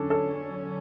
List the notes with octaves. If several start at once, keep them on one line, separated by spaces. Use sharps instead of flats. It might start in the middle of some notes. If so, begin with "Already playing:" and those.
Already playing: D3 F#3 C#4 D4 A4
A4